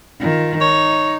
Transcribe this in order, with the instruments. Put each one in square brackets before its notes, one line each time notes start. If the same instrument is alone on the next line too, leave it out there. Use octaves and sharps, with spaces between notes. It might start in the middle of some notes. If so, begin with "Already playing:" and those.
[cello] D#3 F4
[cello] D#4 [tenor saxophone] C#5